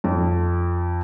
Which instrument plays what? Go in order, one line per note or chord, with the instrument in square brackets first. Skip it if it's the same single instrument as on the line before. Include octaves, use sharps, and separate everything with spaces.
[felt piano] F2